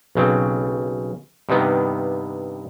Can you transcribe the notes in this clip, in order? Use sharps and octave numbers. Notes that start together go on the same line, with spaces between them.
B1 C#3 C4
G2 C3 D#3 B3